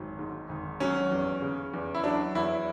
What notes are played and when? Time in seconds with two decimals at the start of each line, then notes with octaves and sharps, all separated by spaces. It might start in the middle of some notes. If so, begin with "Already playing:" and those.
Already playing: G#1 F#3
0.19 G#2
0.49 G#1
0.80 F#3 C#4
1.12 E2
1.42 C#3
1.74 E2
1.95 E4
2.04 F#3 D4
2.35 E2 E4